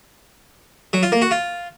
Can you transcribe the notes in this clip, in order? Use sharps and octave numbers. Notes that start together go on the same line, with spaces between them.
F#3
F4
A#3
F#4
F4